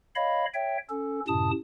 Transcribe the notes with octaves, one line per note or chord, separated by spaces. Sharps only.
C#5 D#5 F5 B5
C#5 E5 G5
C#4 A4
F#2 A2 C3 A5 D#6